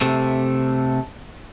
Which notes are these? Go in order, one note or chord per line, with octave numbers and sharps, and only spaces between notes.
C3 A3